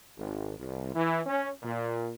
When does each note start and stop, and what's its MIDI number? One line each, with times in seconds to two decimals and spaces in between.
0.17 0.58 32
0.58 0.91 36
0.94 1.20 52
1.26 1.51 61
1.63 2.13 46